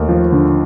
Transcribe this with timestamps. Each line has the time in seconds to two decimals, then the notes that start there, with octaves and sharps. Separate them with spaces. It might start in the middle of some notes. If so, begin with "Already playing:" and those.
Already playing: D#2 A3
0.09 F3
0.32 D3